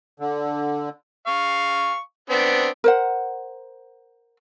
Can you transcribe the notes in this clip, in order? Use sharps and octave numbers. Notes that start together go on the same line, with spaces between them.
D3
F5 C#6
B3 C4 D4
A#4 C5 F#5